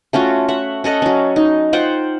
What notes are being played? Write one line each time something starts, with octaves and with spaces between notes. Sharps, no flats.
A3 C#4 F4 F#4
E5 F#5
C#4 A4 D#5 F#5
F#3 C#4
D#4
F4 C5 F#5 G5